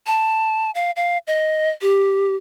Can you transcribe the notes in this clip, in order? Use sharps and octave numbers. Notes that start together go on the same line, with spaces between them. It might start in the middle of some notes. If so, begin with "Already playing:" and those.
A5
F5
F5
D#5
G4